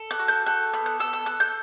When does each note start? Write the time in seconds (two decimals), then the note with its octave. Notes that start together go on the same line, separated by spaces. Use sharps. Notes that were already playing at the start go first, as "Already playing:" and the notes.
Already playing: A4
0.11 F#6
0.19 F#4
0.28 G6
0.46 A4 F#6
0.73 B3 F#6
0.86 F#6
1.00 A4 E6
1.13 E6
1.26 A4 F#6
1.40 G6